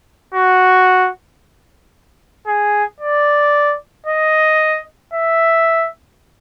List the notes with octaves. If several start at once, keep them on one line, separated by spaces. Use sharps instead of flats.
F#4
G#4
D5
D#5
E5